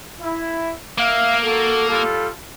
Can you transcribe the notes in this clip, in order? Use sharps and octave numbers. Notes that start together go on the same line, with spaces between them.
E4
A#3 E5 F5
F#4 A4
G3 F4 A4